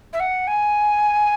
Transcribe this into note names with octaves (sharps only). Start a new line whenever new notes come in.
E5
F#5
G#5